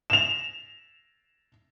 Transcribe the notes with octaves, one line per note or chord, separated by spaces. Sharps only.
E7 F7